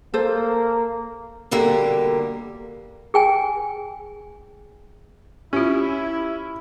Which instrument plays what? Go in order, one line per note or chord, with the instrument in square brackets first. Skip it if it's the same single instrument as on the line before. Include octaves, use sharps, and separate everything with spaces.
[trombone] A#3 [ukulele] A4 C5
[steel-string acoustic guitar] B2 D3 G3 A#3
[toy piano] G#4 G5 G#5
[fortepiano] C#4 [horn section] E4 [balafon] F4 G4